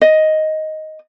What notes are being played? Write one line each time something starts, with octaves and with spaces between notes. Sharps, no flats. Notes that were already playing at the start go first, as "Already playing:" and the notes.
D#5